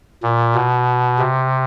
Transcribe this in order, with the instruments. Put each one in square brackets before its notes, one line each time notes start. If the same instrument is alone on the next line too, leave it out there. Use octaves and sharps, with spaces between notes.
[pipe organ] A#2
B2
C3